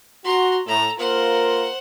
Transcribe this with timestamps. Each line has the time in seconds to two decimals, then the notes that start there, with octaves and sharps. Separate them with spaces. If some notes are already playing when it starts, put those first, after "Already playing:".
0.25 F#4 A#5 C6
0.67 A2 A4 A#5
0.99 A#3 F4 A#4 C5 F#5